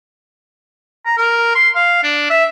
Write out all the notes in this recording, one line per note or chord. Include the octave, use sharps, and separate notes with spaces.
A#5
A#4
C6
F5
D4
E5